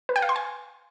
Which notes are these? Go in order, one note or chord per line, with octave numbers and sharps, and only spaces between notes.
B4
G5
F5
C6
G#5